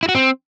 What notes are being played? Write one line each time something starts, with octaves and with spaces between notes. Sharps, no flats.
E4
F#4
C4